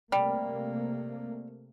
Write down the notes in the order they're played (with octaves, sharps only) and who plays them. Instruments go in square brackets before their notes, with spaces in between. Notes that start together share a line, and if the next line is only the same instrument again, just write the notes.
[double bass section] C3 A3 A#3 [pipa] G3